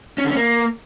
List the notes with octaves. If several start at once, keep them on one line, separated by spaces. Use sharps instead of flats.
C#4
D3
C#4
A#3